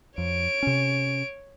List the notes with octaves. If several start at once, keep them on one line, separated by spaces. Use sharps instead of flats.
F2 C#5 D7
C3 C#4